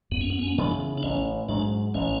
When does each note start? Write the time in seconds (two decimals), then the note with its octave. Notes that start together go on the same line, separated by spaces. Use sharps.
0.11 F#2 B3
0.21 C#4
0.30 B3
0.39 C#4
0.47 B3
0.58 C#3 E3 B3 D4
0.98 D4
1.03 A1 C#4
1.48 G#2 F#3 D4
1.94 A1 C#4